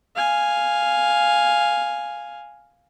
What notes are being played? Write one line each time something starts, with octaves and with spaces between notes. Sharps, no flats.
F5 G#5